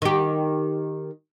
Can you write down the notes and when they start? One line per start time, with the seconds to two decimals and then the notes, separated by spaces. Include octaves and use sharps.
0.02 D#3 G4